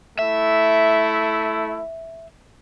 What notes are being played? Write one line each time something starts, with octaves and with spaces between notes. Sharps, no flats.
A3 E4 E5